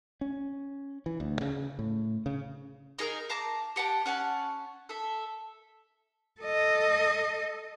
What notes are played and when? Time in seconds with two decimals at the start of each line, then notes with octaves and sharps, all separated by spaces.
0.21 C#4
1.06 E3
1.20 D2
1.41 C#3
1.79 A2
2.26 C#3
2.99 D#4 G#4 A#4 F5
3.30 F5 A5 A#5 D6
3.76 G4 F#5 G5 A5
4.06 C#4 F#5 G#5 A5
4.89 A4 E5
6.41 A4 D#5